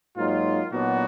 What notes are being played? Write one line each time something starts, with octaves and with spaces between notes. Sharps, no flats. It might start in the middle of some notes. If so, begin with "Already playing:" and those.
G#2 F#3 A#3 D#4 F4
A#2 F#3 B3 D4 D#4 F#4